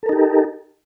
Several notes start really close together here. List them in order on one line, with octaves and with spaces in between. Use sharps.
A4 A#4 D#4 G4